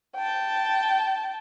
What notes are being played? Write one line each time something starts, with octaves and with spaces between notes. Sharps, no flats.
G5 A5